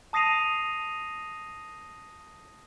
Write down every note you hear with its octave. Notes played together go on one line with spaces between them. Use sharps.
A5 D#6 A#6 C7 D#7 F7